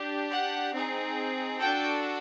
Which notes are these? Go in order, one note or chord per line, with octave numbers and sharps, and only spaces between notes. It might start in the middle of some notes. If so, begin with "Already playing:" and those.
Already playing: D4 G4
F#5
C4 D#4 G#4
D4 F#4 A4 G5